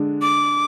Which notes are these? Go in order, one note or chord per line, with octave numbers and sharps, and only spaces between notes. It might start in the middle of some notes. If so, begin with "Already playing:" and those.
Already playing: D3 G#3 D4
D6